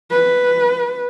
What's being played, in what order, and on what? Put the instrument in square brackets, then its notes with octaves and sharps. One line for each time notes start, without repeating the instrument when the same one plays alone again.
[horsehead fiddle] B4